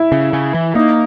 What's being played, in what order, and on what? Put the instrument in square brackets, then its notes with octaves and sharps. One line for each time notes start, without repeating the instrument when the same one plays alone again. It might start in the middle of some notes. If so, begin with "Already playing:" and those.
Already playing: [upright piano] E4
[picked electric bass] C#3
C#3
E3
[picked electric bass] A#3 [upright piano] D#4